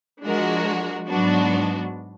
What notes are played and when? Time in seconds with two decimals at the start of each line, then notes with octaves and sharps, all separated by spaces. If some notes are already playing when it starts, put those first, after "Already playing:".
0.25 F3 G#3 D4 F#4 A#4
1.09 G#2 F#3 B3 D4 F#4